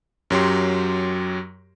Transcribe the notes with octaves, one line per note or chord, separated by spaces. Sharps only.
F#2 F#3 G4 C6